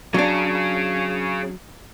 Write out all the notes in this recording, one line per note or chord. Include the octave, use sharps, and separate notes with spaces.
F#3 C#4 D4 G#4